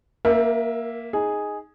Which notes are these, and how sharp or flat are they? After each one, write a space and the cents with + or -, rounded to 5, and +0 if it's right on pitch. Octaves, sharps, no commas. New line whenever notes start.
A#3 +0 A#4 +35 E5 +0
D#4 +0 G#4 +0